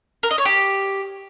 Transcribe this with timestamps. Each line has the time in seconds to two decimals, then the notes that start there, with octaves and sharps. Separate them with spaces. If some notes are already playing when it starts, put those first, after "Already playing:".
0.23 A#4
0.31 D#5
0.38 C#5
0.45 G4